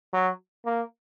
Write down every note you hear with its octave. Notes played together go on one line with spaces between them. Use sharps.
F#3
A#3